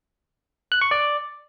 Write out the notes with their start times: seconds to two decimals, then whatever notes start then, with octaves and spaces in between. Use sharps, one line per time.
0.72 F#6
0.81 C#6
0.91 D5